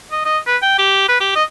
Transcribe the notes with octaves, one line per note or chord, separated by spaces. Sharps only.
D#5
D#5
B4
G5
G4
B4
G4
D#5